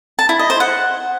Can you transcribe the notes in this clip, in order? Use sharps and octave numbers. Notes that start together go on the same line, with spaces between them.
A5
E4
D#5
C5
F#5